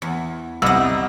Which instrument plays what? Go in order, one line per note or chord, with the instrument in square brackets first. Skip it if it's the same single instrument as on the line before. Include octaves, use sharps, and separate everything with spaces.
[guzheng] E2
[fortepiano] C2 E6 [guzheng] B3 D#4